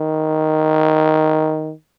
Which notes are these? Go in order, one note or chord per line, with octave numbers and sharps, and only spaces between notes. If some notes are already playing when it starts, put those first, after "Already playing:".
Already playing: D#3